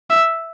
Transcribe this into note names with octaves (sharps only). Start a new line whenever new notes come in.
E5